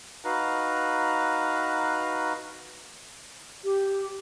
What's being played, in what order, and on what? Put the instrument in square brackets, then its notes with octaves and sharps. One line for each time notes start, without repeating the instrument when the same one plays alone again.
[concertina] D#4 F#4 B4 F5 A#5 F#6
[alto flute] G4